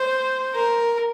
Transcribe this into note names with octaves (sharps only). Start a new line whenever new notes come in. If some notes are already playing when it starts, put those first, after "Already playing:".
Already playing: C5
A#4